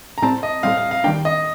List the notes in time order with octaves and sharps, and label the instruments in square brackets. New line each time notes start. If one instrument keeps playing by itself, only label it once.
[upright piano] A#5
[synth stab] A2 G3 C4 [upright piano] A5
[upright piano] D#5
[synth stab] A2 G3 C4 [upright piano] F5
[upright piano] F5
F5
[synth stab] D#2 D#3 G3 A#3 D4 [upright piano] G5
[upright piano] D#5